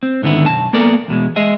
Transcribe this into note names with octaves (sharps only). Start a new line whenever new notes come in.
C4
G#2 D3 D#3 B3 E4
B1 F#2 A5
A#3 B3 A4 A#4 D5
E2 B2 G#3
G#3 G#4 D#5 E5